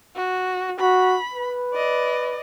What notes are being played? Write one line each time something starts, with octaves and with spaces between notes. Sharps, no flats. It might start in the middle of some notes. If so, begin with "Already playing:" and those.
F#4
F#4 B5
B4
D5 D#5